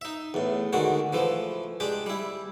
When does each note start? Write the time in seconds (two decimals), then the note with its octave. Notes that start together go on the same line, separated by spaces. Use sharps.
0.01 D#4 E5
0.34 E2 A2
0.73 D3 D#3 G#3 F#4
1.13 E3 F3 A3
1.80 G#3 D4 G4
2.06 G3 E4